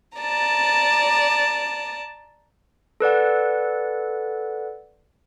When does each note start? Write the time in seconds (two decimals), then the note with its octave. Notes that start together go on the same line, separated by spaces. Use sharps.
0.18 D5 A5 A#5
3.00 A4 B4 D5 F#5